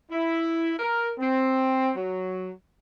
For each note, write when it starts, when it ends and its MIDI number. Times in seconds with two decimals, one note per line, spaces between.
0.10 0.72 64
0.79 1.10 70
1.19 1.90 60
1.94 2.50 54